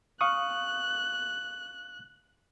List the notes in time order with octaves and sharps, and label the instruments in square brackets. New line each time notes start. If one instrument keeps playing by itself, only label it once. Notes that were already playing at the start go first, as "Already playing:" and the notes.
[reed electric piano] F5 C#6 D#6 [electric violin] F#6